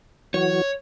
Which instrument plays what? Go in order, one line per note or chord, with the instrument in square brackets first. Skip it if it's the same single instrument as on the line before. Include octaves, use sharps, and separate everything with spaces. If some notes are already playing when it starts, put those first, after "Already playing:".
[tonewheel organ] E3 F#3 F#4 [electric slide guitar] C#5